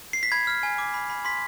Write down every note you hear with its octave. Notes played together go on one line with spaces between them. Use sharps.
C7
B6
B5 G#6
F6
G#5
D6
B5
B5
C6 B6